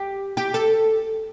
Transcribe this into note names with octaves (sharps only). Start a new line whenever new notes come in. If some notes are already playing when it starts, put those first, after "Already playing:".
Already playing: G4
G4
A4